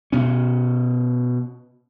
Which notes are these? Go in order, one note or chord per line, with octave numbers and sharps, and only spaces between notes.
B2 C#4